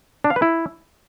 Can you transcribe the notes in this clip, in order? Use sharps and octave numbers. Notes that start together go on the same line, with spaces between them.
D4
F5
B4
E4